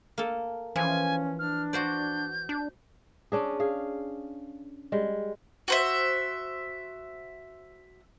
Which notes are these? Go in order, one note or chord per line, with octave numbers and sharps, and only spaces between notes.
A#3 A4
E3 F3 C#4 G#5
D4 F6
F#4 C5 D5 G6
D4
C#4 D4 G#4
G#4 F5
G3 G#3
F#4 C5 E5